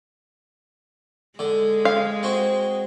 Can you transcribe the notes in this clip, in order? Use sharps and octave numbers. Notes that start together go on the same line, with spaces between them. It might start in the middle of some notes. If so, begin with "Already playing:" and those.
D3 G#3
F5
C4 F#4